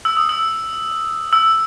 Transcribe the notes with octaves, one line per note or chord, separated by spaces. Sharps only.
E6
D#6
E6
E6